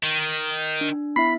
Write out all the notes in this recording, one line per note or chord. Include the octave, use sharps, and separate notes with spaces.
D#3
D4
B3 E4 E5 B5 C7